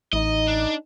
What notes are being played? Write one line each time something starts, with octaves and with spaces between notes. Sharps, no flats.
A1 D#4 D#5
D4